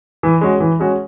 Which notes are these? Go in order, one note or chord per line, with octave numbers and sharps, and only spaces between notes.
E3
G#3 C#4 F#4
E3
G#3 C#4 F#4